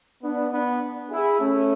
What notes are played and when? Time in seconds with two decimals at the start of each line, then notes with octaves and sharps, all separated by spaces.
0.23 B3 D4
0.52 B3 D4
1.10 E4 G#4
1.40 A3 C#4